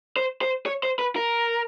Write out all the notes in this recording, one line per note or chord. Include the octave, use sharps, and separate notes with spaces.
C5
C5
C#5
C5
B4
A#4